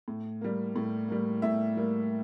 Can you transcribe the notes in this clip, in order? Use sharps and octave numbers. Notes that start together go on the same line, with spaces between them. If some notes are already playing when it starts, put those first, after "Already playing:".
A2
G3 A#3
A2
G3 A#3
A2 E5
G3 A#3